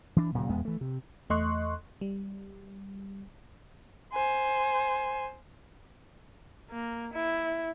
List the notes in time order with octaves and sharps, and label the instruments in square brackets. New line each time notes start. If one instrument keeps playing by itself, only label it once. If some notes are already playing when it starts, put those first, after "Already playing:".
[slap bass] E3 D4
D1 A#2 C#3 F#3
D#1 E2 G#3 B3
E3 A3
C3
[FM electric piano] E2 A3 D#5 C6 C#6 F#6
G3
[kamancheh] C5 G#5
[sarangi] A#3
E4